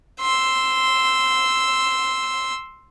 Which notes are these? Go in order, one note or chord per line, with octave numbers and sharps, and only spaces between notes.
C6 E6